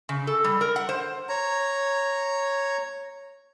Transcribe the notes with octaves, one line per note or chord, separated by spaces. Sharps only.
C#3
A4
G3
A#4
F#5
C5
C#5 A#5